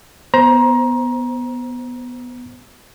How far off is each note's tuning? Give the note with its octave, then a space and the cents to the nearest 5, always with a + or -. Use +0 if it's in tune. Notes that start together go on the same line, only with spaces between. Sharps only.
B3 +0 C5 +0 A#5 +25